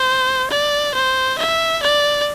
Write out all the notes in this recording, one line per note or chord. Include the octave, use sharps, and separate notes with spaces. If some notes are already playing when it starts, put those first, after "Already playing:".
Already playing: C5
D5
C5
E5
D5